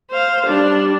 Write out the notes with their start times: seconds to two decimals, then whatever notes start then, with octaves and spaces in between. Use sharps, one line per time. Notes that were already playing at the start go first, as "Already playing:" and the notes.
0.11 C5 F5
0.46 G3 D4